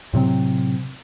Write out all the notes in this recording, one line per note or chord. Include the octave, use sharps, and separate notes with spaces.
A2 C3 F#3 C4